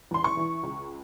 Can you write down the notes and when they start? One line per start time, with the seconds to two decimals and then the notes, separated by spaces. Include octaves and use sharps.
0.11 E2 C6
0.24 C#6
0.37 E3
0.63 C#2